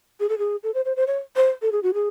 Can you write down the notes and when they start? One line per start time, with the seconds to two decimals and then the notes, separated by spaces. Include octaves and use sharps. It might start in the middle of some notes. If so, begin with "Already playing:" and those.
0.20 G#4
0.29 A4
0.38 G#4
0.63 A4
0.74 C5
0.85 C5
0.96 C5
1.07 C#5
1.36 C5
1.62 A4
1.72 G#4
1.83 F#4
1.94 G#4